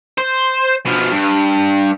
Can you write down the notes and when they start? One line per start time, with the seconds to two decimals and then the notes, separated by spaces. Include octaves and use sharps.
0.18 C5
0.86 B2 F3
1.12 G2